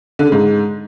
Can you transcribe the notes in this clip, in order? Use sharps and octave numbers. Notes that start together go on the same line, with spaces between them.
D3
C#3
G#2